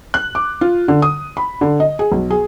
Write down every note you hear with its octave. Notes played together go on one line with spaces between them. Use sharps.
F#6
D6
F4
D3
D#6
B5
D3
D#5
G#4
B1
G#4